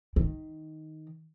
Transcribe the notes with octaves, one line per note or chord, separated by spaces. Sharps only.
D#3